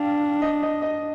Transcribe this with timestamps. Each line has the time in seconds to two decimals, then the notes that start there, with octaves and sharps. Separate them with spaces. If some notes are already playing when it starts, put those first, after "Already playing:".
Already playing: D4 F5 G5
0.42 D#5
0.62 D#5
0.82 D#5